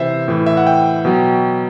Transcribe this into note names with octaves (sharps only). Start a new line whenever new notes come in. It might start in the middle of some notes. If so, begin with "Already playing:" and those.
Already playing: C3 E3 C5 E5
A2 E3
E5
F#5
G5
B2 F#3